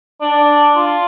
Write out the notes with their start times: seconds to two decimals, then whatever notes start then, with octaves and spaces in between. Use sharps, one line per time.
0.22 D4
0.76 F4